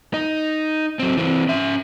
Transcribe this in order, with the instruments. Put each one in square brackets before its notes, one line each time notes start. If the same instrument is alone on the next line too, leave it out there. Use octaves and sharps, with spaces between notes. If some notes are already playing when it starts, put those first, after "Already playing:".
[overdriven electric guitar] D#4
F#3 C4
E3 C4
C#4 E5